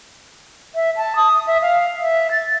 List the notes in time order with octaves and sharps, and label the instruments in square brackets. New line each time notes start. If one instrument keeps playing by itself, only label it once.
[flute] E5
A5
D#6
E5
F5
E5
A6